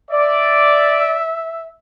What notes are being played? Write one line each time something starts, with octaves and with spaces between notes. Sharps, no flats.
D5 E5